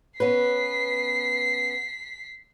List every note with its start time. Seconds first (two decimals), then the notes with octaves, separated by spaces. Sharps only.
0.20 B3 C#4 B4 B6 C7